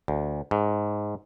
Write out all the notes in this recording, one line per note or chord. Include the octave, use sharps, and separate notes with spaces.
D2
G#2